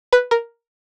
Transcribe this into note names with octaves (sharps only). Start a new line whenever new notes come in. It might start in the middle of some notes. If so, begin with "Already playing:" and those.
B4
A#4